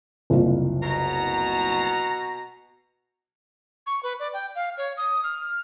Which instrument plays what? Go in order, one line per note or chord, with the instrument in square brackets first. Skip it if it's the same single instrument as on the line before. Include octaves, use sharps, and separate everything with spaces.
[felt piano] F#1 C2 F4
[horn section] B2 F#4 A#5
[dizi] C#6
B4
D5
G5
F5
C#5
D#6
F6